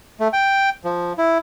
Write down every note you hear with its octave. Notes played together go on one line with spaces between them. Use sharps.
A3
G5
F3
E4